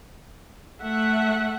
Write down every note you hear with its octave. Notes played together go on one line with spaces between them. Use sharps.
A3 E5 F#5